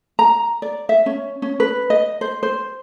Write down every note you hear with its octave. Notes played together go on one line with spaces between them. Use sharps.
A#5
D5
E5
C#4
C#4
B4
D#5
C5
C5